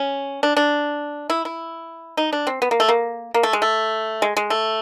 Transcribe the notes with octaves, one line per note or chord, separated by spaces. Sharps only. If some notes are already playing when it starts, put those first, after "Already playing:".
Already playing: C#4
D4
D4
E4
E4
D#4
D4
C4
B3
A#3
A3
A#3
A#3
A3
G#3
A3
G#3
G#3
A3